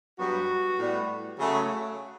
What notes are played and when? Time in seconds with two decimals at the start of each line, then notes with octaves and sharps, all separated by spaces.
0.19 G2 F#3 B3 F#4
0.78 A2 G3 B3
1.38 C#3 F#3 A3